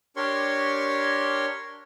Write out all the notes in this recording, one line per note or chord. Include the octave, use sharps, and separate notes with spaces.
D4 G4 A#4 C#5 C6 C#6